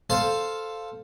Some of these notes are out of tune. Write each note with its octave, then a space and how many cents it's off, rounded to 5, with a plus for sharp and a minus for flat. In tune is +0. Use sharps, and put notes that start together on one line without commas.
A4 +0 C5 +0 F5 +0